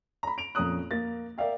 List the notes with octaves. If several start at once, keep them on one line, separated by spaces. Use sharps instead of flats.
A#5 B5
D7 F7
F2 A#2 C#4 A#5 D#6 F#6
A#3 A6
A#4 D5 E5 F5 G5